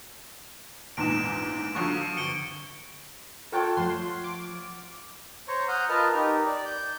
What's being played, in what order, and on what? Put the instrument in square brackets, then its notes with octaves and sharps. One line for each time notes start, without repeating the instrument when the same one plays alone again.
[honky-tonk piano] A#1 E2 G#2 [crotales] D7 E7
[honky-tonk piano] D3 F3 F#3 [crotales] C#6
[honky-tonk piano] G1 [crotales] C#7 D7 G7
[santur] F4 C#5 F#5 [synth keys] A4 G5 A5
[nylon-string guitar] F3 A3 [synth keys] C6
[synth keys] D6
[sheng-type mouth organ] C5 C#5 A#5 C#6
F#5 A#5 D#6 F6 G6
F4 A#4 B4 D#5 A5 F6
D#4 G4 A#4
D5
G6